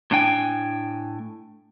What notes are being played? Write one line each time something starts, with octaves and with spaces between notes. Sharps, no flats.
A2 D4 G5 G#5